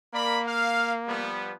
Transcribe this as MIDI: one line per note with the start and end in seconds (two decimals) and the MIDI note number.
0.14 1.29 58
0.14 0.40 70
0.14 0.40 74
0.14 0.40 83
0.48 0.93 77
1.08 1.53 53
1.08 1.53 55
1.08 1.53 59